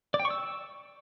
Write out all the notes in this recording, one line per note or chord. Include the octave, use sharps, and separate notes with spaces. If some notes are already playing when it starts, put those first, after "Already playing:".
D5
G5
C#6
E6